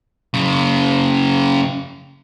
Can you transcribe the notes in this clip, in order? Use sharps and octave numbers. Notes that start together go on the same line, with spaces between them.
F#2 C#3